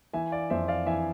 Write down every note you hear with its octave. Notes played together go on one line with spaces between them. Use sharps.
E3 E5 G#5
D5 F5
F2 C5 E5
D5 F5
E3 E5 G#5